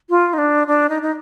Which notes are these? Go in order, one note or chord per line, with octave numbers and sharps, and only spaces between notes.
F4
D#4
D4
D4
D#4
D#4